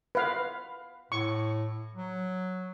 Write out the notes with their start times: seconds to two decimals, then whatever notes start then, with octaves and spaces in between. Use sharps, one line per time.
0.15 B4 F5
1.12 A2 C#6
1.95 F#3